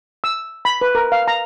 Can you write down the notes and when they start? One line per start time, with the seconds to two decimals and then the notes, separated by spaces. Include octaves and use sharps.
0.24 E6
0.65 B5
0.81 B4
0.95 A#4
1.12 F5
1.28 A#5